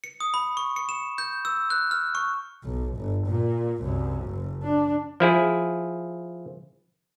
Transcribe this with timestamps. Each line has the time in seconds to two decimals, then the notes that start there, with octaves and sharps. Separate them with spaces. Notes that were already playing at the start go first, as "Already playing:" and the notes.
0.04 C#7
0.20 D#6
0.34 B5
0.57 C#6
0.76 C#7
0.89 E7
1.18 G6
1.45 E6
1.70 F#6
1.91 F6
2.15 C#6
2.64 B1
2.97 G1
3.27 A#2
3.80 C2 F#2
4.24 F#1
4.63 D4
5.20 F3 E4 G#4